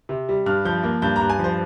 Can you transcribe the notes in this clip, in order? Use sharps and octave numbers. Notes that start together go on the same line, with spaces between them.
C3
G3
G2 F6
F3 G6
A#3
G2 G6
G2 A#5
G#5
F3
C5